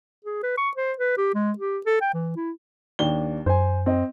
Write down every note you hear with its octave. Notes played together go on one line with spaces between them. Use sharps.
G#4
B4
C#6
C5
B4
G4
G#3
G4
A4
G5
E3
E4
D#2 D4 G7
F#2 C5 G#5
C4 D#5